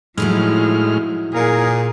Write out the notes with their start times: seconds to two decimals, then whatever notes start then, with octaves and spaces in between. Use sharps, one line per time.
0.18 A2 F3 F#3 G#3 D#4 E4 F6
1.34 A#2 G#4 A#4